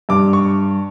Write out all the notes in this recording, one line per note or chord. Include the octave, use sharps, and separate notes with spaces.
G2 D6
C#6